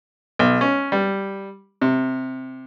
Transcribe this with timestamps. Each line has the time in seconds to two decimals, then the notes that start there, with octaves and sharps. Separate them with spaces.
0.39 B1
0.61 C#4
0.92 G3
1.81 C3